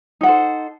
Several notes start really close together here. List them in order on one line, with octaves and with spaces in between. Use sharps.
D#4 F#5 A4 C5